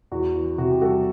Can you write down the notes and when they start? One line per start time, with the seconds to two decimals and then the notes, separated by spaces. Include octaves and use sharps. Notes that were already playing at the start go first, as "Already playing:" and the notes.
0.12 E2 F#4
0.35 E3
0.58 C3 F#4
0.71 G4
0.81 G3 F#4 A4